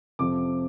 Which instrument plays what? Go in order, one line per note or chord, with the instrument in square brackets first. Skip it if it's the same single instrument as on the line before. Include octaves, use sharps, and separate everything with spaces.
[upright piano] F2 C3 F3 D6